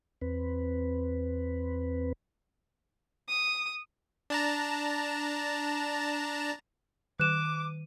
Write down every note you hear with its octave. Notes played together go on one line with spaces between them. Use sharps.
E2 C4 B4
D#6
D4 A5 A#5
D#3 D6 F#6 D#7 E7